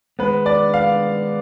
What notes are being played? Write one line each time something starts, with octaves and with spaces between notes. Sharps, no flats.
D#3 G#3 B3 B4
D5
F5